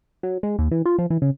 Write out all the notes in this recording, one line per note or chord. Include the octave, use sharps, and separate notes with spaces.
F#3
G#3
D#2
E3
F4
F3
E3
C#3